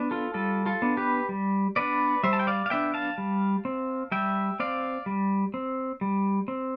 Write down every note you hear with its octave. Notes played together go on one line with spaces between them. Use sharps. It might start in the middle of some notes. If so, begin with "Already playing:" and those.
Already playing: B3 D4
F4 A4
G3 F4 A4
F4 A4
B3 D4
G4 B4
G3
B3 D4 B4 D5
G3 C5 E5
A5
G5
D5 F5
F5
B3 D4 E5 G5
F5 A5
G3
C4
G3 E5 G5
C4 D5 F5
G3
C4
G3
C4